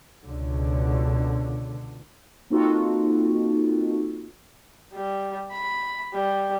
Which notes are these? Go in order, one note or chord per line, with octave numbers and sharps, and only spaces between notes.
C#2 B2 D3
A#3 C4 D#4 F4 F#4 A4
G3
B5
G3